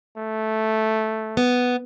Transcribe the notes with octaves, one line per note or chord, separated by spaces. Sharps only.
A3
B3